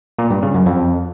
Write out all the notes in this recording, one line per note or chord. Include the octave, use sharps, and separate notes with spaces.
A#2
G2
C#3
F#2
F2